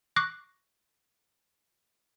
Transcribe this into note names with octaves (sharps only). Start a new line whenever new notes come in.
C#6 D6 F#6 A#6 C7